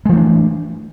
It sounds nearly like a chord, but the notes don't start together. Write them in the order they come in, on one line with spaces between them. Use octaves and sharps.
G#3 E3 A3 D4